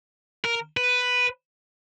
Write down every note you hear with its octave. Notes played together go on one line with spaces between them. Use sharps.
A#4
B4